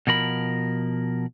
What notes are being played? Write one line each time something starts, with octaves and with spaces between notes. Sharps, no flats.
B2 F3 A#4 B5